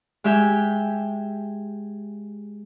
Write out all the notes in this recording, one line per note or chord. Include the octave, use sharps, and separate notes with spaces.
G#3 G4 E5 G5 G#5